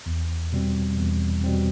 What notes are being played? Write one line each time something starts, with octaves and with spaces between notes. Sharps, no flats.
E2
B2 G3 C4
E2
B2 G3 C4